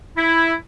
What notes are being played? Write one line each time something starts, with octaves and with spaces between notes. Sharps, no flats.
E4